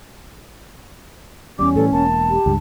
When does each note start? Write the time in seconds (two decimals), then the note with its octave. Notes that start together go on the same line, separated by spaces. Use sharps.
1.59 E2 G3 C#4 D6
1.76 A2 E3 G3 A4
1.92 E1 A#3 A5
2.30 G4
2.46 C#2 G2